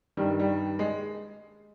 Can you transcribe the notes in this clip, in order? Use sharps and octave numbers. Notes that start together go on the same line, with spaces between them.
G2 D#3 G3
G3
G#3